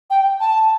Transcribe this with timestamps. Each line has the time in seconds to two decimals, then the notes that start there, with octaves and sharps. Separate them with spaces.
0.10 G5
0.40 A5